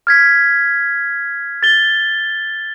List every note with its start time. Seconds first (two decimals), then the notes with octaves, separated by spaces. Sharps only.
0.07 F6 G#6 B6
1.63 A6 G7